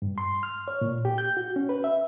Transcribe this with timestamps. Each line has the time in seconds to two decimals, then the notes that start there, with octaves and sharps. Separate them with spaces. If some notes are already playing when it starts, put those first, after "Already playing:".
0.02 G2
0.18 C6
0.43 F6
0.68 C#5
0.81 A#2
1.05 G4
1.18 G6
1.37 F#4
1.56 C#4
1.69 B4
1.84 E5